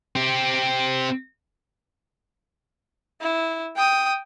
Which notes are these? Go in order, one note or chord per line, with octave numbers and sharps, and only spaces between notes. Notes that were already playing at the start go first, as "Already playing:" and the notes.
C4 G4
E4
G5 D#6